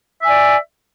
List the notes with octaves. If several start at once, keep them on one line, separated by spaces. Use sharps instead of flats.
D5 E5 G#5